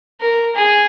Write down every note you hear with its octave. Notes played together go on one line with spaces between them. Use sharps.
A#4
G#4